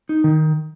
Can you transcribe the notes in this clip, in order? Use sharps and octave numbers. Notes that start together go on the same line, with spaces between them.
D#4
D#3